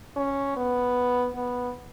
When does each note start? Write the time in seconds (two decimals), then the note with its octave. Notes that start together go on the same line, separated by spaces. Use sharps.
0.17 C#4
0.57 B3
1.35 B3